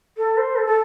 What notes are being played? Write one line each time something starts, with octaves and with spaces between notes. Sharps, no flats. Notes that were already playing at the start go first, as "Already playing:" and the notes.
A4
C5
A4
A4